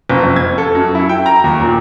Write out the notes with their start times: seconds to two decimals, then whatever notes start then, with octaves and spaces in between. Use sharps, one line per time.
0.09 F#1
0.23 F2
0.36 G#6
0.58 A4
0.75 F#2
0.95 E4
1.09 G5
1.26 A#5
1.44 D#2
1.61 A#2